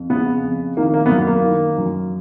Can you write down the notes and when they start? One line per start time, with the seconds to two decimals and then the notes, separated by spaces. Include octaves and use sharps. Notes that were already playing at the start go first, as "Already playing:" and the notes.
Already playing: F2
0.10 C#3 B3
0.44 F2
0.77 D#3 A#3
0.94 A#3
1.06 B3
1.10 F#2 A#3
1.27 A#3
1.44 D#3
1.78 F#2